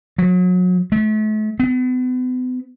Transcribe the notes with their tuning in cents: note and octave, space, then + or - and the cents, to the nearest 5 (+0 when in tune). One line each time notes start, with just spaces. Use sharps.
F#3 -30
A3 -40
B3 +40